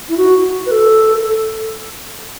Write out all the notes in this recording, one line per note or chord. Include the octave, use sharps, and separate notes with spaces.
E4
F#4
B4
A4